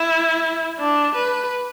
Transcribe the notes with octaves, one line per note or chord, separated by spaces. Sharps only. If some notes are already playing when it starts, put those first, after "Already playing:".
Already playing: E4
D4
B4